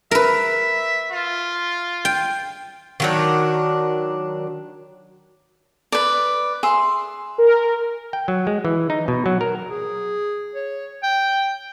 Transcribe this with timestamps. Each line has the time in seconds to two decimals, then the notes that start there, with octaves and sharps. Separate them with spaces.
0.11 A#4 B4 E5
1.11 F4
2.05 G5
3.00 D#3 F#3 D4
5.92 B4 D5
6.63 G#4 E5 C6
7.38 A#4
8.13 G5
8.28 F#3
8.47 G#3
8.65 E3
8.90 D#4
9.08 B2
9.26 F#3
9.41 A#4
9.69 G#4
10.55 C#5
11.03 G5